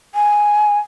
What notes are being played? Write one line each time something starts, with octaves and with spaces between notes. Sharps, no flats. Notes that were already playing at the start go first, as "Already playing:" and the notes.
G#5